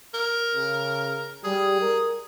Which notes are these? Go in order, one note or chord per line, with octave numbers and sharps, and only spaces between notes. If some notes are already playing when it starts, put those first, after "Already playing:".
A#4
C#3
G3 G#4
A#4